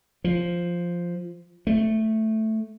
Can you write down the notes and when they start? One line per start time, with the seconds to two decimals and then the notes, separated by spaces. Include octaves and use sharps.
0.24 F3
1.67 A3